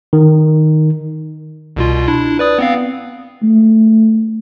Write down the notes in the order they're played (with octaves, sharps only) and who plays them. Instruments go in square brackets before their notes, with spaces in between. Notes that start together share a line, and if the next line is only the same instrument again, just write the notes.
[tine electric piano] D#3
[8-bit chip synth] C2 B2 F4
D4 E4
B4 D5 D#6
B3 C4 F5
[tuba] A3